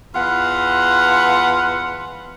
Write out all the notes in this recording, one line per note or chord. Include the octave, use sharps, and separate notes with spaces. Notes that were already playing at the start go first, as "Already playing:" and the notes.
E2 F4 B4 F#5